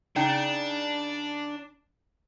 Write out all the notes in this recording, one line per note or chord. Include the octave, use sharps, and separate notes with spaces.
C#3 D4 D#4 G5